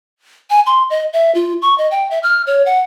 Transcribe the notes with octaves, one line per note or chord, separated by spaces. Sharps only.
G#5
C6
D#5
E5
F4
C#6
D#5
G5
E5
F6
C#5
F#5